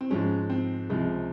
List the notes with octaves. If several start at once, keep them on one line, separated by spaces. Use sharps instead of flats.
C4
G#2 F3 G#3 C#4
C4
C#2 C3 F3 G#3